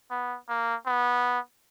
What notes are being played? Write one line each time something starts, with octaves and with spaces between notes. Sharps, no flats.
B3
A#3
B3